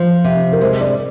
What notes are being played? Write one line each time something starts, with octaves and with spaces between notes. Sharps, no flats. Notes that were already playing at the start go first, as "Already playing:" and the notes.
Already playing: F3 C5
C3
A#4
G#3 C5
D5